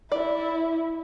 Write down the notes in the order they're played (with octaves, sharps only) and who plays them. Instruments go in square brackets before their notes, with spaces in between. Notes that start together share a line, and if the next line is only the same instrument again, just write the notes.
[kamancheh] E4 [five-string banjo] D5